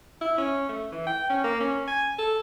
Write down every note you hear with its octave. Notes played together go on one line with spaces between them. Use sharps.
E4
C#4
A3
E3
G5
C#4
A#3
C#4
G#5
A4